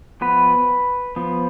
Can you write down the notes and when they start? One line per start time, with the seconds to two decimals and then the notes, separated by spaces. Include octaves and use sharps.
0.21 F3 B3 B4
1.16 F3 B3